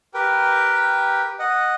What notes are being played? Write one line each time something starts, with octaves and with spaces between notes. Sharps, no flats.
G4 A#4 B4 G5
D#5 F#5